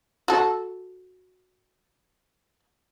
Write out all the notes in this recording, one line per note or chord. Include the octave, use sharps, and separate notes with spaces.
F#4 A4